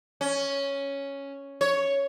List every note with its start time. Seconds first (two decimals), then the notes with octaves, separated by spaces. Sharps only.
0.21 C#4
1.61 C#5